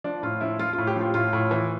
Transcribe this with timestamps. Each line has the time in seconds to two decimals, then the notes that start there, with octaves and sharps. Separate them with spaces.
0.04 F3 D4
0.23 A2 F4
0.41 F3 E4
0.59 F3 F4
0.73 A2 F4
0.87 G4
0.96 F3
1.01 F4
1.14 A2 F4
1.33 A2
1.51 E3